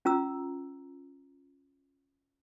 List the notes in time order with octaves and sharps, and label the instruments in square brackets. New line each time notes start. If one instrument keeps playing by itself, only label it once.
[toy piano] C#4 F4 A#5 E6